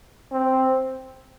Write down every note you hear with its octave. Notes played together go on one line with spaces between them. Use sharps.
C4